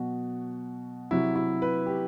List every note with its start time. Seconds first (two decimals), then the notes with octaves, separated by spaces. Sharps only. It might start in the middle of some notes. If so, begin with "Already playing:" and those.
Already playing: B2 F#3 F#4
1.11 C3 F#3 E4
1.36 E4
1.62 B4
1.86 G4